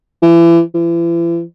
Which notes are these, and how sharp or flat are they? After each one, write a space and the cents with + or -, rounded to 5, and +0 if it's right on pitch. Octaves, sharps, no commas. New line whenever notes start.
E3 +30
E3 +40